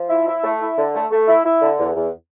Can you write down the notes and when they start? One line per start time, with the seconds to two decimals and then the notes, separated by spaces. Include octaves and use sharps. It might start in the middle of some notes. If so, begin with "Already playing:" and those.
Already playing: F3
0.10 E4
0.27 E4
0.44 A3
0.61 E4
0.78 D3
0.95 A3
1.11 A3
1.28 E4
1.45 E4
1.62 D3
1.78 E2
1.96 E2